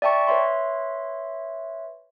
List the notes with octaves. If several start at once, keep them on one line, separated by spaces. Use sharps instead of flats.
D5 E5 G5 A5 C#6
B4 C#5 E5 C6